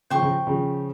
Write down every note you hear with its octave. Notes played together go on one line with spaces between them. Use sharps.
C#3 F3 C5 G5 C#6
C#3 F3
C#3 F3